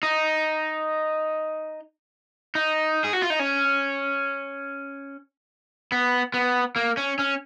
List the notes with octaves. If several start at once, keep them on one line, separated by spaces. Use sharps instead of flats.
D#4
D#4
G#4
F#4
F4
D#4
C#4
B3
B3
A#3
C#4
C#4